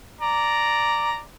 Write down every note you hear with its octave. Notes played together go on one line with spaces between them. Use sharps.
D5 A#5